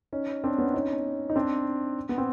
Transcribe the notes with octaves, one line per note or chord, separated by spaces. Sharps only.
C#4 D#4
C4 D4
B3 C#4
C#4 D#4
D#4
C4 D4
B3
C4